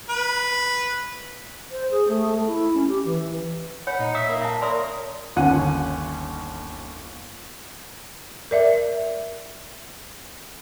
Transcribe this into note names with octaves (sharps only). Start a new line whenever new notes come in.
B4
C5
G#4
A3
A3
E4
C#4
G4
E3
C#5 F#5 B5
A#2 D#4
E5 D#6
A#3
E5 A5
A#4 C#5 D5 C6 D#6
G1 D#2 C#4 F#5 D#7
A#4 D5 E5